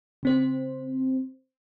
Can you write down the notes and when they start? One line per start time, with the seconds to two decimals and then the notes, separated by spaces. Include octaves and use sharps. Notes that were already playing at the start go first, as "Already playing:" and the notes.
0.23 C#3 C4 C5